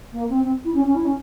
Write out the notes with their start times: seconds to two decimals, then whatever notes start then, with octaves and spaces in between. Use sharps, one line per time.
0.12 A#3
0.29 C4
0.43 C4
0.64 E4
0.74 C#4
0.84 C#4
0.95 E4
1.05 C#4